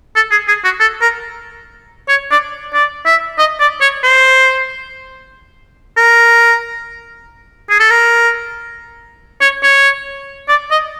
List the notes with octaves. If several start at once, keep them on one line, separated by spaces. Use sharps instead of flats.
A4
G#4
G#4
F#4
A4
A#4
C#5
D5
D5
E5
D#5
D5
C#5
C5
A#4
G#4
A4
A#4
C#5
C#5
D5
D#5